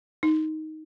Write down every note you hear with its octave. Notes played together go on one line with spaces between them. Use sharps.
D#4